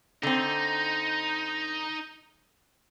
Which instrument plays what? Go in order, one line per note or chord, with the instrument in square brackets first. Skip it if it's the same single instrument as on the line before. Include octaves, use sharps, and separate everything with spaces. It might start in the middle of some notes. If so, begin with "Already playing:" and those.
[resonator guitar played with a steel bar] D3 C4 [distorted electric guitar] D#4